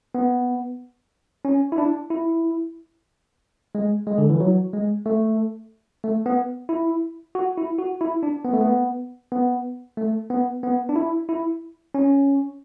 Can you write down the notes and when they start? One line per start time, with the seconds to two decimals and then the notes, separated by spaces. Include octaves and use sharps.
0.15 B3
1.45 C#4
1.72 E4
1.78 D4
2.10 E4
3.75 G#3
4.07 G#3
4.18 D3
4.30 E3
4.40 F#3
4.73 G#3
5.06 A3
6.04 A3
6.26 B3
6.69 E4
7.35 F#4
7.57 E4
7.78 F#4
8.01 E4
8.23 D4
8.45 B3
8.53 A3
8.61 B3
9.32 B3
9.97 A3
10.30 B3
10.63 B3
10.89 D4
10.96 E4
11.29 E4
11.94 C#4